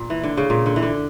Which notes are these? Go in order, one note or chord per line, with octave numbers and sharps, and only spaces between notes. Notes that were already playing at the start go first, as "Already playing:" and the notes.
Already playing: A#2
E3
D3
C#3
A#2
D3
E3
D3